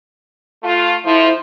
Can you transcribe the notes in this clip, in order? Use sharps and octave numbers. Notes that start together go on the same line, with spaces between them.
A3 F4
F2 F3 E4 C5